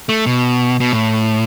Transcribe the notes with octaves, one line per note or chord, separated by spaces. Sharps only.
A3
B2
B2
A2